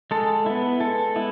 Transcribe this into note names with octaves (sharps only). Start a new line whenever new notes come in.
G#3 A4
B3 E4
G#3 A4
B3 E4